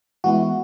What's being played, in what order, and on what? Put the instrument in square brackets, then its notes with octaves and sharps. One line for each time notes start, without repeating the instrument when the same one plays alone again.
[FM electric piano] E3 G#3 B3 E4 F#4